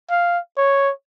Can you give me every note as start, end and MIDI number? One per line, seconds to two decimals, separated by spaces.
0.10 0.39 77
0.57 0.92 73